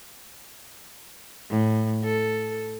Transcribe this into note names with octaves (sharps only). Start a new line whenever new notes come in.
A2
A4